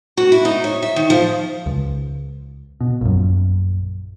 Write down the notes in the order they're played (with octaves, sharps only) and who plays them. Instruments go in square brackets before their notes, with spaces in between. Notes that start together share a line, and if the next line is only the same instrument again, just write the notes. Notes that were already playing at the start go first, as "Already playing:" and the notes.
[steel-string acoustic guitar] F#4
E4
D#4
C#5
E5
D#3
F3
[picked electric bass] C#2
B2
A#1 F#2